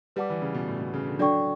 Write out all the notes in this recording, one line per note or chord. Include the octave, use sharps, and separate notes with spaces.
G3 B4 D5 F#5 A5 D6
E3
C#3
B2
A2
B2
C#3
D3
F#3 D4 A4 D5 G5 C#6